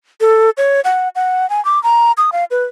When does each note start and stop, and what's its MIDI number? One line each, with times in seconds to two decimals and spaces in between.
0.21 0.50 69
0.57 0.81 73
0.84 1.09 78
1.15 1.49 78
1.50 1.63 80
1.65 1.82 86
1.83 2.12 82
2.18 2.30 87
2.32 2.45 77
2.51 2.64 71